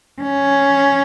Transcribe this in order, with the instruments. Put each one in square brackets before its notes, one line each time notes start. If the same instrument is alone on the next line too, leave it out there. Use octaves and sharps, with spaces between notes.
[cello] C#4